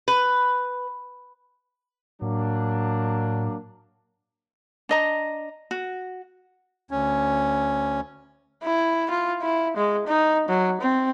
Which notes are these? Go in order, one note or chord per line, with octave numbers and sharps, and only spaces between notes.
B4
A2 F#3 A#3 D4
D4 D#5 A#5
F#4
D2 C#4
E4
F4
E4
G#3
D#4
F#3
C4